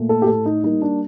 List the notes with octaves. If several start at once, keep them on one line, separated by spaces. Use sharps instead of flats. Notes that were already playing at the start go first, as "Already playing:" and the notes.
Already playing: A#2 A3
A4
G4
A2 A4
D#4
G3 A#3 D#4
D4